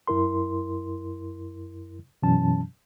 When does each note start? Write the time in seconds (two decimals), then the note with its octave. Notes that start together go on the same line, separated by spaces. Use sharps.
0.07 F#2 E4 A#4 C6
2.22 F#2 B2 E3 F#3 C#4 A5